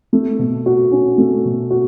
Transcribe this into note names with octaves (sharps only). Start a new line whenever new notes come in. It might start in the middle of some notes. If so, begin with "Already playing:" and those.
A3
B2
F#4
C#4
A3
B2
F#4